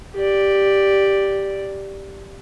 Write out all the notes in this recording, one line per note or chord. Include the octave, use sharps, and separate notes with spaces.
G4 D5